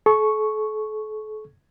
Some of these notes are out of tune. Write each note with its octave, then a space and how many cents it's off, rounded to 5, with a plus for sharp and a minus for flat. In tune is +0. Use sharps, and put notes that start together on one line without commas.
A4 -40 C#6 +0